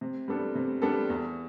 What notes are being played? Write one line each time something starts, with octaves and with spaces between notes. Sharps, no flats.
C3
G3 B3 D4 A4
C3
G3 B3 D4 A4
E2